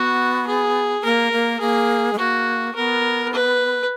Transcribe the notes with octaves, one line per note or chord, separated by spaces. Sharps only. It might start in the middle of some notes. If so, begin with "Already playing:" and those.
Already playing: B3 F#4
G#4
A#3 A#4
A#3
A#3 G#4
G#3
A#3 F#4
B3 A#4
B4